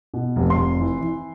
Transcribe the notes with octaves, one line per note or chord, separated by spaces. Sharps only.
B2
F1
C6
F1
E3
E3